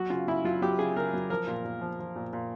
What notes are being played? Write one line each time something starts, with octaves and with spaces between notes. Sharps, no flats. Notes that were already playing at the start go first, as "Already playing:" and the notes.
Already playing: F#3 F#4
C#3 F4
C#3 E4
F#3 F4
F#3 G4
C#3 G#4
C#3 A#4
F#3
F3 A#4
A#2
A#2
F3
F3
A#2
A#2